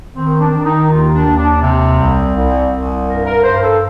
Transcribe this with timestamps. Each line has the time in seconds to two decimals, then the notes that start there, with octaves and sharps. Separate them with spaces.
0.16 D#3 C4
0.40 D4
0.52 D#3
0.65 D#4
0.89 D#2 F4
1.13 D4
1.26 D#2
1.38 D4
1.61 C3 C4
1.98 C2
2.35 C2
2.71 C2
3.07 G2 A#4
3.26 A#4
3.44 G2 C5
3.57 A#4
3.62 A4